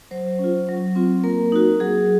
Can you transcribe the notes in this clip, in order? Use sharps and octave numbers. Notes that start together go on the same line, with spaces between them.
F#3 C5
C#4 F4
F#3
C4 F4
A#3 A#4
D#4 F#4
F#3 G#4